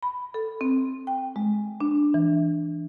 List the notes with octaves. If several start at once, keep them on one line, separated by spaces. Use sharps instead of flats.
B5
A4
C4
G5
G#3
D4
E3